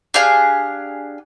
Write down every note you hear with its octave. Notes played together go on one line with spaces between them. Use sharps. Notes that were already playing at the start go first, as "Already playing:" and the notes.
D4 G4 G#4 F5